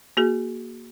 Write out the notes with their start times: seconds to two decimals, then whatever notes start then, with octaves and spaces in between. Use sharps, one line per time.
0.17 A#3 F#4 G#4